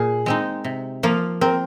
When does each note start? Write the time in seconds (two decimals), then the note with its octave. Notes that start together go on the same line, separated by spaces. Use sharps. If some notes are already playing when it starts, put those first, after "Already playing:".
Already playing: A#2 G#4
0.26 G#3 C4 D#4
0.64 C3
1.03 F3 A#3 F4
1.41 C4 A#4